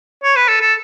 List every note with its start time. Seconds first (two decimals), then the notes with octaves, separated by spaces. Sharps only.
0.24 C#5
0.36 B4
0.49 A4
0.61 A4